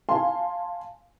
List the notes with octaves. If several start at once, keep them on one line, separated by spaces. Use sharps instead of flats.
F5 G#5 A5 C6